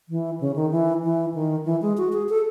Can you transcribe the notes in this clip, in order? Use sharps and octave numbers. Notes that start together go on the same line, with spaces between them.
E3
C#3
D#3
E3
E3
D#3
E3
G#3
F#4
G#4
A4